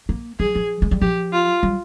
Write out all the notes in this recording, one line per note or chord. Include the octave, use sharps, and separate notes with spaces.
A#3
G3 G#4
F3
G#3
G3
F3 G4
F4
G3